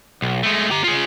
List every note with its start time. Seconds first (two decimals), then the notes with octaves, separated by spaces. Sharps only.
0.22 B1
0.43 G#3 A3
0.71 G4 A#5
0.84 F4 G#4